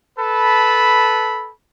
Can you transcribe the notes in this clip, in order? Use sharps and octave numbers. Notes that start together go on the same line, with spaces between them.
A4 B4 A5 B5